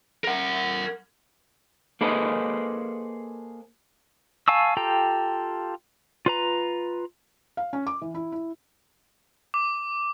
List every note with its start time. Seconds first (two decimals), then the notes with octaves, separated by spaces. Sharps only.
0.24 A#4 F#5
2.01 A#3 G#4 A4 B4 C5 D#5
4.48 F5 G#5 A5 C#6 E6
4.77 F4 G4 A4 G5 A#5
6.26 F4 B4 A#5
7.57 F5
7.73 C#4
7.87 D6
8.02 E3
8.14 E4
8.32 E4
9.54 D6